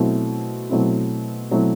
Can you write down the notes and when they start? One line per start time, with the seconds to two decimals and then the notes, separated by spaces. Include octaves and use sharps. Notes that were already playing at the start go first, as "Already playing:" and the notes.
Already playing: B2 F#3 A3 C4 E4
0.69 B2 F#3 A3 C4 E4
1.51 B2 F#3 A3 C4 E4